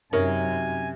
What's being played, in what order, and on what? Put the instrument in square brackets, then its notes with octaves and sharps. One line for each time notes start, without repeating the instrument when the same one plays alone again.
[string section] F#2 [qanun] C3 [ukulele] D#4 A#4 C#5 [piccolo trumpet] G#5